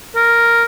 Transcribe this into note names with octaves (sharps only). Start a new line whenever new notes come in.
A#4